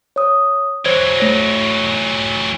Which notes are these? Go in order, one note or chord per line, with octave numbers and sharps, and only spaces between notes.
C#5 D#6
E3 F#3 C5 C#5 G#6
A3 C#5 A#6